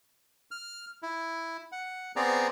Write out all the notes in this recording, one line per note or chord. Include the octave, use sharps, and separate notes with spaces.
F6
E4
F#5
B3 C4 G#4 D5 A#5